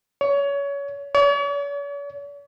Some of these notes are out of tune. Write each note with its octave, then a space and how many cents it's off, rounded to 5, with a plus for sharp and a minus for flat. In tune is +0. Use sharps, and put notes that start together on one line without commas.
C#5 +25
C#5 +45